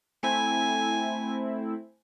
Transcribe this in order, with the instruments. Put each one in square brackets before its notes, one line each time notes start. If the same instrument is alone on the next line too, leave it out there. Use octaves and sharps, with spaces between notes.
[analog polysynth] A3 C4 E4 [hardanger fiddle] G#5